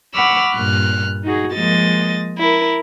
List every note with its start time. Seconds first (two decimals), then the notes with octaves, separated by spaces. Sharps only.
0.15 F#5 B5 C#6 D6 E6 F6
0.55 G2 A#2 F6 F#6
1.24 D#4 F#4 G#4
1.54 F3 G#3 A#3 D#5 A6
2.38 E4 A#4